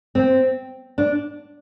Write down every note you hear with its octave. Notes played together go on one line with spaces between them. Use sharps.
C4
D4